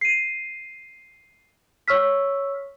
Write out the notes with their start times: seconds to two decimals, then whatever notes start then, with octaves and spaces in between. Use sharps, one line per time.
0.01 C7 D#7
1.88 C#5 C#6 E6 F6 B6